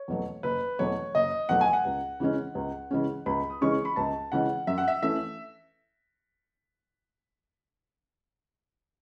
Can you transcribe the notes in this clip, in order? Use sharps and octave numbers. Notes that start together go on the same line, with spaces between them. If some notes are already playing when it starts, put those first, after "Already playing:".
Already playing: C#5
E2 B2 F#3 A3
F#1 B4
E2 B2 F#3 A3 C#5
F#1 D#5
E2 B2 F#3 A3 F#5
G#5
F#5
C#2
C#3 E3 G#3 C#4
C#2
C#3 E3 G#3 C#4
C#2 B5
D#6
C#3 E3 G#3 C#4 C#6
B5
C#2 A5
C#3 E3 G#3 C#4 F#5
F#2 E5
F#5
E5
E3 A3 C#4 E5